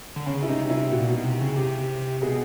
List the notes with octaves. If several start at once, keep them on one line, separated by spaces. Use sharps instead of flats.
D3
C#3 C#4
E4
C3 D#4
C3 E4
A#2 F#4
B2
C3
C#3
C3 G4
B2 G#4